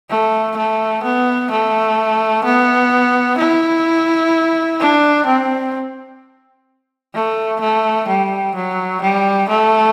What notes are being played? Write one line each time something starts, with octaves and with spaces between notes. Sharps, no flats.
A3
A3
B3
A3
B3
E4
D4
C4
A3
A3
G3
F#3
G3
A3